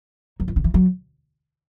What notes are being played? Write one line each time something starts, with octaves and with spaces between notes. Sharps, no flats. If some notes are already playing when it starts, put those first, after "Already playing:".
F#3
E3
D3
E3
F#3